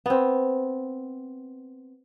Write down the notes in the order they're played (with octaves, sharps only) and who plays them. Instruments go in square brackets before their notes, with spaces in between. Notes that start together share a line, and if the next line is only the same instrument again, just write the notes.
[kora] B3 C4